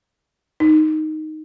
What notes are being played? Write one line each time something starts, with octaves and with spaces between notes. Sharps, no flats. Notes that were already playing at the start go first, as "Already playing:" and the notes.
D#4